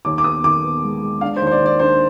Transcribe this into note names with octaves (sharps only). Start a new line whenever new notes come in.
D#2 D6
D6
B3 D#6
D#3 D6
B3
G#3
G#3
D4 F5
C5
D#2
C5
D5
D#3
D5
D4 C5